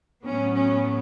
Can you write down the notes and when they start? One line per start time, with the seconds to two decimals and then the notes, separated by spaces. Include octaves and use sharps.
0.24 A2 F#3 B3 C#4
0.54 C#4